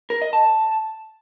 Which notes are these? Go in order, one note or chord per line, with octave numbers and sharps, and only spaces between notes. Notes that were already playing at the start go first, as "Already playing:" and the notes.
A#4
D#5
A5